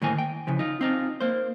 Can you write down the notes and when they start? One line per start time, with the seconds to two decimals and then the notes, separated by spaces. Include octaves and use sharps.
0.02 A2 D#3 A#3 G#5
0.18 G5
0.47 C#3 E3 F3
0.59 D#4 F4
0.81 C4 D#4 F4
1.21 A#3 C5